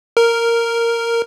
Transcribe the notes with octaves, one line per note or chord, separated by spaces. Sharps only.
A#4